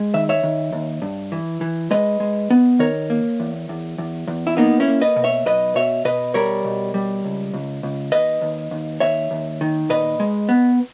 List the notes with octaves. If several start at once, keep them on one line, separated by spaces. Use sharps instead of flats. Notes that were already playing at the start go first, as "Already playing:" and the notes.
Already playing: G#3
D#3 E5
C#5 E5
D#3
D#2
G2
E3
E3
G#3 B4 D#5
G#3
B3
D#3 A#4 C#5
A#3
E2
E2
E2
E2
E4
A#3 B3 D#4
C#4 E4
A#3
B4 D#5
B2
C#5 E5
B1 B4 D#5
B2 C#5 E5
B2 B4 D#5
G3 A#4 C#5
B2
G3
C#2
C#2
C#2
D#2 B4 D#5
D#2
D#2
D#2 C#5 E5
D#2
D#3
A#2 B4 D#5
G#3
B3